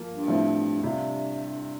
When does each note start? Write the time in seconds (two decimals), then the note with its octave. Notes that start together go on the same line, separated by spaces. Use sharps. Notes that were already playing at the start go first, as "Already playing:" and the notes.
Already playing: F3 A#3 F4
0.09 G2
0.28 A2 F3 C4 E4
0.83 G2 C3 G3 D4 F4